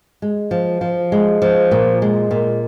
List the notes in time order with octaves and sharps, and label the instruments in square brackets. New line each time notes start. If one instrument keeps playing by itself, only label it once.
[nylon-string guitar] G#3
F3
F3
G#3
F3
A#2
G#3
A#2